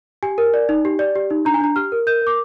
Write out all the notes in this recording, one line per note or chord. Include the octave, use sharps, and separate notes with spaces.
G4 G#5
A#4
D5
D#4
G4
D5
G4
D#4
D4 A#5
G#5
D4 A#5
G4 F6
A#4
A#4 G6
A#4
D6